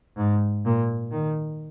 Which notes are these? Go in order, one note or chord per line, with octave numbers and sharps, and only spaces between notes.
G#2
A#2
D#3